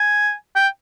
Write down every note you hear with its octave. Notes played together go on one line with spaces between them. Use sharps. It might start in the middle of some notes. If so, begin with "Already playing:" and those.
Already playing: G#5
G5